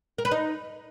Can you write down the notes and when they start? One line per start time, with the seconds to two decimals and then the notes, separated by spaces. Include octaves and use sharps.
0.18 A#4
0.25 B4
0.31 D#4